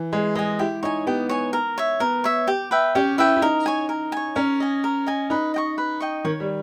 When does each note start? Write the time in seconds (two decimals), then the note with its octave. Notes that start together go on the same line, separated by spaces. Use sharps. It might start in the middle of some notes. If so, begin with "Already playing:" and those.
Already playing: E3
0.13 G#3 G#4
0.35 G#3 D#5
0.39 G#5
0.59 E4 G4
0.83 D#4 C#5 G#5
1.07 B3 G4
1.29 C#5 G#5
1.53 A#4
1.78 C#5 E5
2.00 B3 A#4
2.24 C#5 E5
2.47 G4
2.71 B4 E5 G5
2.95 C#4 G4
3.18 E4 B4 E5 G5
3.36 E4
3.42 D#4 A#4
3.66 C#5 G#5
3.89 A#4
4.12 C#5 G#5
4.36 C#4 A#4
4.60 D#5 G#5
4.84 A#4
5.07 D#5 G#5
5.30 D#4 B4
5.54 D#5 G5 C#6
5.78 B4
6.00 D#5 G5 C#6
6.24 D#3 C#5
6.40 G3